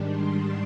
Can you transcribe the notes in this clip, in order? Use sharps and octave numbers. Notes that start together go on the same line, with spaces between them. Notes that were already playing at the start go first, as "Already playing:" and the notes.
Already playing: G#2 D#3 G3 D4
C6